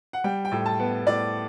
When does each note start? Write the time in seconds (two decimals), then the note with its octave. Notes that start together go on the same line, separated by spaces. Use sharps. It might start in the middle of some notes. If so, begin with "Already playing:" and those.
0.13 F#5
0.24 G3 G5
0.45 G5
0.52 A2
0.66 A5
0.79 B3
1.06 A2 D5